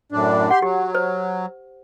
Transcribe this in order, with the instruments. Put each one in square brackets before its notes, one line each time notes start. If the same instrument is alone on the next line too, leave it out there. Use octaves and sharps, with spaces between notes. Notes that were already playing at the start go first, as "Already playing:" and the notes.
[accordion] F#2 A2 D4
[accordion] G4 C6 [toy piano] F#5
[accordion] F#3 [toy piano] G4
[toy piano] C5